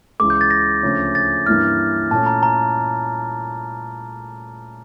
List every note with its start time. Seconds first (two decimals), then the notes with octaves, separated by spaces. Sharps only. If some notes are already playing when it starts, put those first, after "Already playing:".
0.20 C#2 C#3 E3 D6
0.30 G6
0.41 A6
0.51 A#6
0.83 D2 C#3 F3 C#4
1.15 A6
1.46 G2 E3 A#3 C#4 E4 F6
2.11 A#2 A3 C#4 A5
2.26 A#5
2.43 A#5